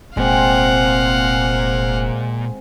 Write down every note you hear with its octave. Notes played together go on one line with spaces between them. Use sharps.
F1 A#2 G#3 C4 F5 F#5